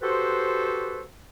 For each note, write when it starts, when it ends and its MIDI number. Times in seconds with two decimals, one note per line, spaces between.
0.01 1.01 66
0.01 1.01 67
0.01 1.01 69
0.01 1.01 71
0.01 1.01 72